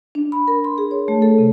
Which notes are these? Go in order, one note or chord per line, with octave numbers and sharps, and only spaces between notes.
D4
B5
A#4
C6
G#4
C#5
A3
A4
C3